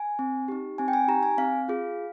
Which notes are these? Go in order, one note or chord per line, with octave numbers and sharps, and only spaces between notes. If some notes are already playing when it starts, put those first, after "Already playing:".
Already playing: G#5
C4
D#4 G4
C4 G#5
G5
G#5
D#4 G4 A#5
G#5
C4 F5
F4 G#4